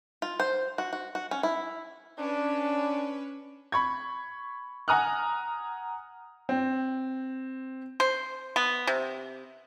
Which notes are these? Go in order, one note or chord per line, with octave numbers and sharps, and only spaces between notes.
F4
C5
F#4
F#4
F#4
C#4
E4
C#4 D4 B4
B5 C#6 G#6
F#5 G#5 A#5 D#6 F6 F#6
C4
C5
B3
C3